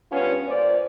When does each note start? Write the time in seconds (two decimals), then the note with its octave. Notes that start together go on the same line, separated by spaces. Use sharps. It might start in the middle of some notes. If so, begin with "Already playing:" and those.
0.11 G2 B3 C#4 F4 C#5
0.47 A#2 C5 D5